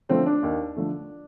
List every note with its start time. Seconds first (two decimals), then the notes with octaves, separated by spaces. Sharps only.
0.09 D3 F3 A3 C4
0.26 D4
0.43 D#2
0.77 D3 F3 A3